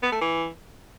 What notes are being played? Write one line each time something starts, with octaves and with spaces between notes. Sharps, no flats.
B3
A3
E3